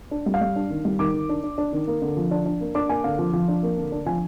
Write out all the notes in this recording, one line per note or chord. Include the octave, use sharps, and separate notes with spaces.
D4
G3
F5
G3
D4
D#3
G3
D#3 D6
D#3
D4
D4
D4
D#3
A#3
D3
F3
D4
D4
A#3
D4 D6
A#3 G#5
D3 F5
F3
F3
D4
A#3
D3
D4
F3 G#5